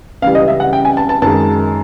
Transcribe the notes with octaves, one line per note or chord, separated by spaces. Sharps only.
C#2 C#3 E3 G3 F5
D#5
E5
F#5
G5
G#5
A5
A5
F#2 D#3 G#3 A5